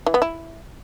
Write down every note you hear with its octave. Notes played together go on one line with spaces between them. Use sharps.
E3
B3
E4